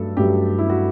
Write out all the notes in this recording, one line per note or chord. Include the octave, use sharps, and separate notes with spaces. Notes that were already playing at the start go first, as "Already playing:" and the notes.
Already playing: G2 F#3 A3 A4
G2 F#3 A3 G4
E4
F#4